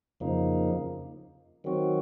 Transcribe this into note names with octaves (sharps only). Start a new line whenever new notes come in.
F2 C#3 F3 A#3 D#4
D#3 F#3 C4 F#4